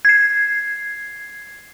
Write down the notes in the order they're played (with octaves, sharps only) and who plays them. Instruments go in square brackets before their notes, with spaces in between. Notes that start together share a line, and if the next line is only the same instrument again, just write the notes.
[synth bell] G#6 C7